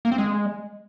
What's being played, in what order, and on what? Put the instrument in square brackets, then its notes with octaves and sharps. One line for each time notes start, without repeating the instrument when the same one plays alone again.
[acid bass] A#3
C4
G#3